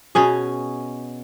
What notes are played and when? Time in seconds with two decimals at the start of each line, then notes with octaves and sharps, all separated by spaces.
0.15 B2 C#4 G#4